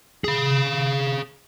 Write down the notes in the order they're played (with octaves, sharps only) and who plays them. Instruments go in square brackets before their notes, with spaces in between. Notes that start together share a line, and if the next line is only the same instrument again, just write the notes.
[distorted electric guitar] G#4 F5